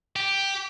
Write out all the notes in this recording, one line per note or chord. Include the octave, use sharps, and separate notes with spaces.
G4